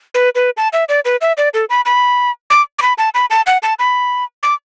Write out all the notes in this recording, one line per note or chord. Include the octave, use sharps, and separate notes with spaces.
B4
B4
A5
E5
D5
B4
E5
D5
A4
B5
B5
D6
D6
B5
A5
B5
A5
F#5
A5
B5
D6